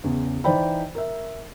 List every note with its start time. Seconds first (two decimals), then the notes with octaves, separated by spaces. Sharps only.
0.04 E2 C#3
0.44 E3 D#4 C5 D5 G5 B5
0.95 A#4 E5